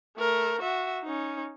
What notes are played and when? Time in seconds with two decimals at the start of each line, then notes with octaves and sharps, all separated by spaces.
0.18 A3 A#4
0.61 F#4 E5
1.03 C#4 D#4